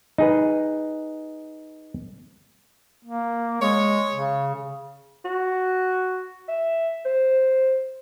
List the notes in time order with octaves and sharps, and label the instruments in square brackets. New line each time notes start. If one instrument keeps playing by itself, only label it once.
[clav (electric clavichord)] D#4 G#4 B4
[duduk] A#3
[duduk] G#3 [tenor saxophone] C#5
[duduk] C#3
[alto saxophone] F#4
E5
C5